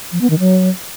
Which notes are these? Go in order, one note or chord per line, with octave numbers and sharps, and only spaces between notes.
F3
B3
D#3
F#3